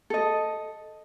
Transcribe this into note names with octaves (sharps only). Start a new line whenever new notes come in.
A4 D#5